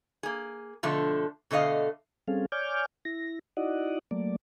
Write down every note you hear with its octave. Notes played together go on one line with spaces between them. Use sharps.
A#3 G#4
B2 D3 F3 A3
B2 D3 A3 D#5 F5
G3 C4 C#4 G#4 A4 F5
C#5 D5 G#5 D6 F6 G6
E4 A#6
D#4 E4 F#4 D5 D#5 F#5
F#3 A3 A#3 D5